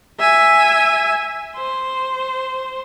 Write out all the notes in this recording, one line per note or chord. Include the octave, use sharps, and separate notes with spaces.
E5 G#5
C5